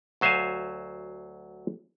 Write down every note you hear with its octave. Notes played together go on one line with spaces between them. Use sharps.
D2 F#3 C5 E5 F5 G#5